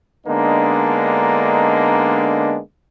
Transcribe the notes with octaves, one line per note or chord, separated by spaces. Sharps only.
D3 G#3 A#3 B3 D4 D#4